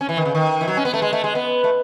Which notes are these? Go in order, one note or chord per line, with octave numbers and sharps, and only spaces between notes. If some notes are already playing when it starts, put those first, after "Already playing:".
C#4
E3
D#3
C#3
D#3
E3
F#3
C#4
B3
A3
G#3
A3
G#3
B3
A3